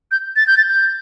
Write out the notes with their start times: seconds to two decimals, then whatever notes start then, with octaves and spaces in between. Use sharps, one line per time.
0.11 G6
0.36 A6
0.47 G6
0.57 A6
0.69 G6